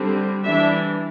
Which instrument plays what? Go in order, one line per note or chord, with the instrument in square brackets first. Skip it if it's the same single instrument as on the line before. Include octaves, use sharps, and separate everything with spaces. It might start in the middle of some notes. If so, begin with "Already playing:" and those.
Already playing: [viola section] D3 G3 C4
E3 G3 D4 E5